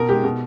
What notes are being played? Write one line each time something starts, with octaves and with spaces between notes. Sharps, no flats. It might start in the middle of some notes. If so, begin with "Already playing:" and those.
Already playing: B2 A#4
G#3 G4
B2